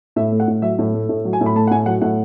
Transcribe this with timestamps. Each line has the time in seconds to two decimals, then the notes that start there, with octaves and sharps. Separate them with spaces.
0.16 A2 E5
0.32 A3
0.40 F#5
0.48 A2
0.62 F#3 E5
0.79 A2
0.94 A3
1.09 A2
1.25 F#3
1.33 G#5
1.41 A2
1.46 B5
1.55 A3 A5
1.67 F#5
1.71 A2 G#5
1.86 F#3 F#5
2.01 A2 F#5